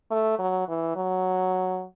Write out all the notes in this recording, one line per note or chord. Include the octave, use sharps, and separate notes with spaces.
A3
F#3
E3
F#3